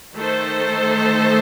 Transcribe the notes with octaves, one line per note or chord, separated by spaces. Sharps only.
D#3 A3 D#4 A4 C5